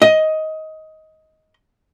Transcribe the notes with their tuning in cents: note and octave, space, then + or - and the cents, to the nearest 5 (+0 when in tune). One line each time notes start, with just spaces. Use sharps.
D#5 +15